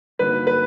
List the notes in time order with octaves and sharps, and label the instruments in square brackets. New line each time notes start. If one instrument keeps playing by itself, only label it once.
[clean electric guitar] G2 D3 F#3 A#3 D#4 [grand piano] B4
[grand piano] B4